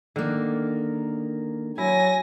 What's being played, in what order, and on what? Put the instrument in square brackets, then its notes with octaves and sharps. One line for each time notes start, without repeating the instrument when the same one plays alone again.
[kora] D3 [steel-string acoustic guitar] D#3 A#3
[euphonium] F#3 [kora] E4 [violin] G#5 A#6